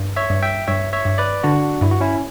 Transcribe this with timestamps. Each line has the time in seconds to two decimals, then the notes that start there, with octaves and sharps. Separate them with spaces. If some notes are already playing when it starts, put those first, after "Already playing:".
Already playing: G2
0.16 C#5 E5
0.30 G2
0.43 E5 G5
0.68 G2 C#5 E5
0.93 C#5 E5
1.05 G2
1.18 B4 D5
1.43 D3 D4 F#4
1.81 G2 E4
1.91 F#4
2.01 C#4 E4